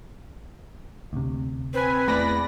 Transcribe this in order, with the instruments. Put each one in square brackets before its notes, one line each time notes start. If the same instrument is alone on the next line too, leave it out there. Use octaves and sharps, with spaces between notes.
[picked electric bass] D2 C3
[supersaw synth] C4 G#5 [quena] B4
[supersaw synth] E2 D5 A#6 [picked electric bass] A3 [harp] B5